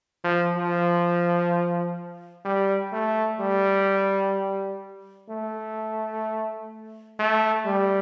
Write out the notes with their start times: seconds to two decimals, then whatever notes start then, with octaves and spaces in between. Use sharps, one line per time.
0.24 F3
0.56 F3
2.45 G3
2.92 A3
3.40 G3
5.29 A3
7.19 A3
7.66 G3